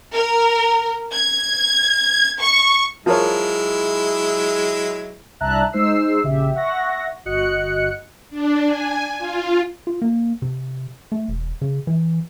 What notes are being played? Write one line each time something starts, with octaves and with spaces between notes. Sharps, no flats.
A#4
G#6
C#6
F3 F#3 G#3 E4 A#4 C#5
C2 D4 E5 A5 A#5 F#6
G#3 D#4 C5 E6 C7
A#1 C#3 G4 E5
E5 F#5 C#6 A#6
G1 F#4 D#5 F#6 C#7
D4
G#5
F4
F4
A#3
C3
A3
E1
C#3
E3